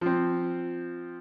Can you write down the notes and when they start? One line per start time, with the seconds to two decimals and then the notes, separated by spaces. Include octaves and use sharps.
0.01 F3 C4